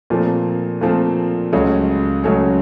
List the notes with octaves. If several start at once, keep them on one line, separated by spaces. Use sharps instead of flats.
A#2 F3 A3 C4
A#2 F3 A3 C4
C#2 C#3 F#3 A3 C#4
C#2 C#3 F#3 A3 C#4